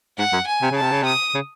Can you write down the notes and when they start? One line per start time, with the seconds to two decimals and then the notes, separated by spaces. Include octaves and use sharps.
0.18 G#2 F#5
0.33 F#2
0.47 G#5
0.62 C3
0.71 C#3
0.77 C3 A5
0.92 C#3
1.03 C3 D#6
1.35 C#3